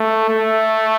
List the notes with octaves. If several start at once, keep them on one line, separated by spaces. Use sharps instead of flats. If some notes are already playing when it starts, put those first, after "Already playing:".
Already playing: A3
A3